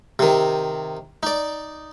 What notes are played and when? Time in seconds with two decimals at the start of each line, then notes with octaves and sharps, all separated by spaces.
0.19 C3 D#3
1.23 D#4 D5